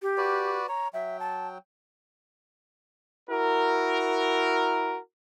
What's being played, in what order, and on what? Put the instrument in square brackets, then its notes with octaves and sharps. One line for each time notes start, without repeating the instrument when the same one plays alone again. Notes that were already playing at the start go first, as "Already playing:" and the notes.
[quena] G4
[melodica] F#4 B4 D5
[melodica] C#5 [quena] A#5
[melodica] F#3 G5 [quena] E5
[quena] A5
[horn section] E4 F#4 A#4